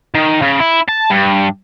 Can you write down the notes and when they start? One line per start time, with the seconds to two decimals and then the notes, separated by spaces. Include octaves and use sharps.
0.14 D#3
0.42 C#3
0.60 E4
0.88 A5
1.10 G2